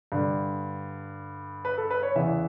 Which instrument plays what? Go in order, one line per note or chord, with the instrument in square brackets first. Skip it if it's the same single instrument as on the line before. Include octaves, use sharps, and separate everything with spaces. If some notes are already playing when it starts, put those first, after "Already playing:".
[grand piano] G2 D3
B4
A4
B4
C#5
E2 C#3 E3 E5